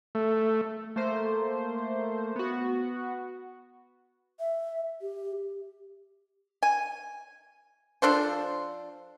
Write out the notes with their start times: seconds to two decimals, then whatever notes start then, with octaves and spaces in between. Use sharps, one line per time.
0.15 A3
0.96 A3 A#3 C5
2.36 B3 F#4
4.40 E5
5.02 G4
6.63 G#5
8.02 F3 D4 A4 C5